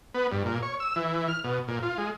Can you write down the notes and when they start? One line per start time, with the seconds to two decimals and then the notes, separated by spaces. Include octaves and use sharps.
0.14 B3
0.32 G2
0.45 A#2
0.63 C#5
0.80 E6
0.96 E3
1.28 F6
1.44 B2
1.68 A#2
1.83 F4
1.98 G#3